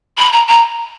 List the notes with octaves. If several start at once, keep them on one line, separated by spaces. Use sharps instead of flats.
B5
A#5
A#5